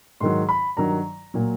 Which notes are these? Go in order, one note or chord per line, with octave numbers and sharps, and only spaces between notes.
G#2 D#3 F#3 C6
B5
G2 D#3 F#3 A#5
A#2 F#3